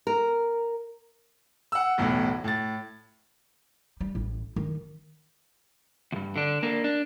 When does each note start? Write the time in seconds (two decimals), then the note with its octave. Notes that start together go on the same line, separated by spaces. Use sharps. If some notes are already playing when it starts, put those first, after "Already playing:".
0.07 A#4
1.72 F#5 E6
1.98 B1 E2 A2
2.44 A2 A6
4.01 G3
4.15 A1
4.56 D#3
6.12 D2 G2
6.36 D3 D4
6.63 A#3 D4
6.84 D4